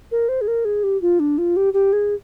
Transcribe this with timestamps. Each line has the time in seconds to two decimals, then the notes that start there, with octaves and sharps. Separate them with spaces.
0.11 A#4
0.29 C5
0.41 G#4
0.48 A#4
0.65 G#4
0.83 G4
1.02 F4
1.20 D4
1.38 F4
1.56 G4
1.73 G4
1.93 G#4